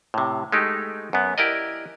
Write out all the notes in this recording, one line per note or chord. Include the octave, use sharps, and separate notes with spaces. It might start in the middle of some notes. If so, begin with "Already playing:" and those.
A2 C3
G#3 A3 D#4 G4
F#2 B3
E4 G4 A#4 D5 D#5